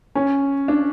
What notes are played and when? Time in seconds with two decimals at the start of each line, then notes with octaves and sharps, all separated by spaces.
0.15 C#4
0.68 D4